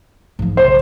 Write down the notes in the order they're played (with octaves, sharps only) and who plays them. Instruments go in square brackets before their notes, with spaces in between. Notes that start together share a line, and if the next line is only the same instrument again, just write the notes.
[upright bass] G#2 F3
[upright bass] B1 C#3 [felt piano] C5